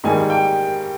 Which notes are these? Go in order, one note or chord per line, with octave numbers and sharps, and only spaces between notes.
G#2 D#3 G3 A#3 D#4 G#5
G5